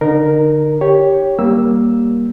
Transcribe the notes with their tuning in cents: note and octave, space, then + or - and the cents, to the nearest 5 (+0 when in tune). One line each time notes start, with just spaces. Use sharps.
D3 +0 D#4 -30 A#4 +0
G4 +0 C#5 +0
G3 +0 A#3 +10 E6 +0